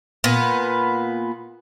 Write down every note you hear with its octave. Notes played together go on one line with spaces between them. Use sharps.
A#2 B3